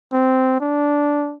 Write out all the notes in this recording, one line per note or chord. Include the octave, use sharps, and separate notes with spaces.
C4
D4